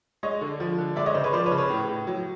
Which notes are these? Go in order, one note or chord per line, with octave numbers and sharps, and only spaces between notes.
G#3 C#5 D#5
D3
F3
D3
G#3 D5 E5
C#5 D#5
C#3 C5 D5
B4 C#5
F3 C5 D5
B4 C#5
C#3
B4 C#5
A2
A2
F#3